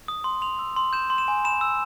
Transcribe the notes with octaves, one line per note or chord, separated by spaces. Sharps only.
D#6
C6
C6 F7
E6
C6
G6 E7
C6
E7
G#5
B5 E7
E6